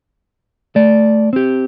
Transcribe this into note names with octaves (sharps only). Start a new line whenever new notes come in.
A3 D5
C4 G4